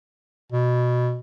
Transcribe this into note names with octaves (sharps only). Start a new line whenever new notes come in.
B2